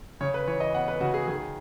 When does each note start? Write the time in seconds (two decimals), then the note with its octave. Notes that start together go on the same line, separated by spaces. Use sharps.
0.21 C#3 C#5
0.34 B4
0.47 E3 C#5
0.60 D#5
0.74 B3 F#5
0.88 B4
1.00 C#3 F#4
1.14 G#4
1.27 D#3 G#4